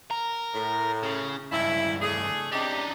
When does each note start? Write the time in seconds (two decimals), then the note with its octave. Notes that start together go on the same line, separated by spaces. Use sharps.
0.11 A#4
0.54 A2
1.03 C#3
1.52 C#2 G2 E4
2.01 A3 D4 G#4
2.52 C3 D4 D#4 G4